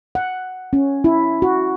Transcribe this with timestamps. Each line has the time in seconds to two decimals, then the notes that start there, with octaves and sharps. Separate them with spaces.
0.15 F#5
0.73 C#4
1.04 E4
1.42 F#4